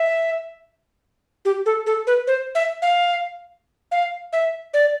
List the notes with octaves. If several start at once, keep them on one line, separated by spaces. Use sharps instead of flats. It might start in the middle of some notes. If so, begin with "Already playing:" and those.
Already playing: E5
G4
A4
A4
B4
C5
E5
F5
F5
E5
D5